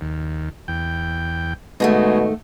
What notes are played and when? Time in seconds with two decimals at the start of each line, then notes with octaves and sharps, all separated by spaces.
0.01 D#2
0.68 E2 G5
1.80 G#2 B2 D#3 G#3 A3 D#4